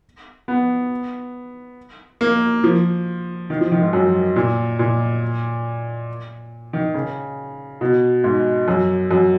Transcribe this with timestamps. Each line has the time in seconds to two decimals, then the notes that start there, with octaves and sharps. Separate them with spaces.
0.48 B3
2.21 A#3
2.64 F3
3.50 D#3
3.61 F3
3.72 D#3
3.82 G#2
3.93 F#2
4.36 A#2
4.79 A#2
6.73 D#3
6.95 C#3
7.81 B2
8.24 G#2
8.68 F#2
9.11 F#2